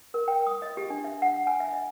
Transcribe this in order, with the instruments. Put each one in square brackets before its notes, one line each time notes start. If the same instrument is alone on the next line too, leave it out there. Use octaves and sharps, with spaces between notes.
[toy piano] A#4
G5
D#6
D#5
G4
D4
E5
F#5
G#5
E5
D#5